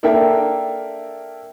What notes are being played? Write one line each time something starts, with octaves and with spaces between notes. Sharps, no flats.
A#3 D4 A4 A#4 E5 G5